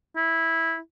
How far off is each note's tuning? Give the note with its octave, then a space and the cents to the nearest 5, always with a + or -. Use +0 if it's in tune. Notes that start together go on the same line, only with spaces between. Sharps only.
E4 -10